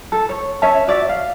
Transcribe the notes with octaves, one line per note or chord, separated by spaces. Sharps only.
A4
C#5
C#4 C#5 E5 A5
F#4 D5 E5
F5